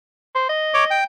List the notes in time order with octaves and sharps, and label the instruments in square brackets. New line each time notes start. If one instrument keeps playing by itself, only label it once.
[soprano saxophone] C5
D#5
[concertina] C#5 D6
G5